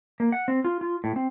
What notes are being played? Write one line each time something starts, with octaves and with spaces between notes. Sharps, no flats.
A#3
F#5
C4
F4
F4
A2
C4